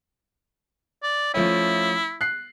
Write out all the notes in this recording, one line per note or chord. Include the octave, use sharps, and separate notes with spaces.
D5
F3 A3 C#4 E4
F#6 C7